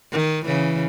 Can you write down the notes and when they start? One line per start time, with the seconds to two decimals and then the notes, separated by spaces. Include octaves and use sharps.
0.12 D#3
0.45 C#3 E3